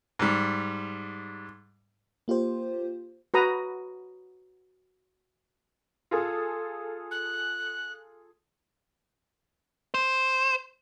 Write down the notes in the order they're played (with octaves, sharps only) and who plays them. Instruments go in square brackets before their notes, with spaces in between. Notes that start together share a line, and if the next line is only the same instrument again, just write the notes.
[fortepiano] G#2 G3
[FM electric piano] A#3 F4 G4 C5
[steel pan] F#4 B4 A#5 D#6
[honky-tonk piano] F4 G#4 A4
[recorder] F#6
[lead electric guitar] C5